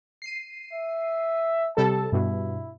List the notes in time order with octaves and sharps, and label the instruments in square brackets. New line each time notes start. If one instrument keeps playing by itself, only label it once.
[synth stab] C7 D#7
[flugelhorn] E5
[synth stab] C3 G3 A4 [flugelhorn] A5
[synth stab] G2 B2 [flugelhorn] E4